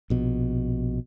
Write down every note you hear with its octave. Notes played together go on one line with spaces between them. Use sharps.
A#1 B2